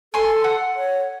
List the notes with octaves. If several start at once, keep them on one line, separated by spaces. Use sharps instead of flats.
A4 G#5 C6
F#5
C#5